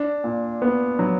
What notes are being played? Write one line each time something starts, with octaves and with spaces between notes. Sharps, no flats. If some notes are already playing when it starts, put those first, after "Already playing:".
Already playing: D4
A#2
B3
F#3